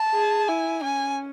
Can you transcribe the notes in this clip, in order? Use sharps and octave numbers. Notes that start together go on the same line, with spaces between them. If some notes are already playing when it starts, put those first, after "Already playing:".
Already playing: A5
G#4
E4 G#5
C#4 G#5